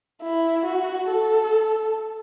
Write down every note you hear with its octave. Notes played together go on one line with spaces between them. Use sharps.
E4
F#4
A4